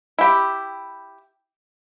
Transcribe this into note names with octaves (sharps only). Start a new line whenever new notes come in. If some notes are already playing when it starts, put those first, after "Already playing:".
E4 G4